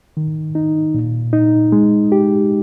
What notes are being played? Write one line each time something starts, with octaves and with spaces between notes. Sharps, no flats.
D#3
D#4
A#2
D#4
G#3
G4